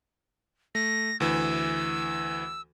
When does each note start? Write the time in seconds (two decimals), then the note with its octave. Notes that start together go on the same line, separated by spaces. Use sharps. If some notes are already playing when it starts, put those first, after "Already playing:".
0.75 A3 A#6
1.20 D2 E3 E6